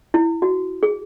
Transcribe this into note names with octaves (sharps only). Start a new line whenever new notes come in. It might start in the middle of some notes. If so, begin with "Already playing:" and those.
E4
F#4
G#4